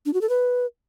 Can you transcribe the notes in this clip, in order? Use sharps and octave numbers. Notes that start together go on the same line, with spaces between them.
D4
F#4
A4
B4